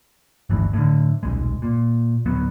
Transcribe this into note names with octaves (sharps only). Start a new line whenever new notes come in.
D1 G1 A2 E3
A2 D3
D#1 B1 G#3
A#2
D1 F#3 B3